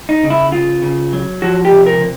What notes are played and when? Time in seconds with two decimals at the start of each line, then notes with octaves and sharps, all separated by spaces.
0.09 D#4
0.24 C#3
0.30 E4
0.52 C#3 F4
0.82 C#3
1.13 F#3
1.42 F3 F#4
1.65 G4
1.72 C3
1.86 A#4
2.01 C3